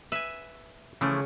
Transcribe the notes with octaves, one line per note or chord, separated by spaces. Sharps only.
B4 E5 G#5
C#3 E3 F3 A3